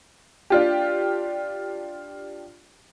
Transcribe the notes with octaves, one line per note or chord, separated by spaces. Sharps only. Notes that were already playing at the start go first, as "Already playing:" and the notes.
D4 F4 G4